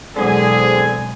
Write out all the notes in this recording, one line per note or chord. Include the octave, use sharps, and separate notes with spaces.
E2 B2 D3 F#3 G#3 C4 G#4 G#5